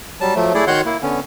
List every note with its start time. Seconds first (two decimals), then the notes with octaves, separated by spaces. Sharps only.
0.21 F#3 G3 A5
0.35 F3 F#3 A3
0.54 A3 E4 G#4 D5
0.67 D#3 F#4 C#5 F#5 C6 G6
0.86 A#3 E4
1.02 D3 B3 C#4